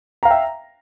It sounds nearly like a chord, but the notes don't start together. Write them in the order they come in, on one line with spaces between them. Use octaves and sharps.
A#5 F5 G5 E5